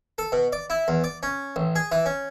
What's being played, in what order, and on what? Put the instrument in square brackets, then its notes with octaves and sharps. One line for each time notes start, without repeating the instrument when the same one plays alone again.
[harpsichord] A4
B2
D5
E4
E2
D5
C#4
A1
G#4
E3
C#4